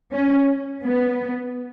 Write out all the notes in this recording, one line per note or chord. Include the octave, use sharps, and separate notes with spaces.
C#4
B3